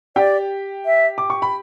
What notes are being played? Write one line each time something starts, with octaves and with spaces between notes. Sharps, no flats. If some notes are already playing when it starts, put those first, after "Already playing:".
G4 D5 G5
E5
D6
C#6
B5